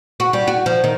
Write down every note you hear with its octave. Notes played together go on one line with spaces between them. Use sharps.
F#4
G3
F#4
F3
D#3